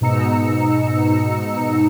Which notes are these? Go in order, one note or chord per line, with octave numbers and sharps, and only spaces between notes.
G#2 B2 D#4 A#5 E6 C#7